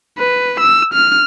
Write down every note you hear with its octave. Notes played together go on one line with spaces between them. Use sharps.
B4
E6
F6